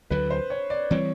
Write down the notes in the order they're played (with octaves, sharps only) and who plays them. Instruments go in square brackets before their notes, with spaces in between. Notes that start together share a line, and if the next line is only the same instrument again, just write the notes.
[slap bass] D2 D3 F#3 [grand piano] B4
[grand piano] C5
C#5
D5
[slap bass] E3 G3 C4 [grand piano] C#5